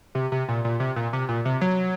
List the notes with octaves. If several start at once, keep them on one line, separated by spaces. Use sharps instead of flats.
C3
C3
A#2
A#2
C3
A#2
C3
A#2
C3
F#3